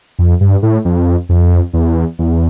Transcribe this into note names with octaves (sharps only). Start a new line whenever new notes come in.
F2
G2
A2
F2
F2
E2
E2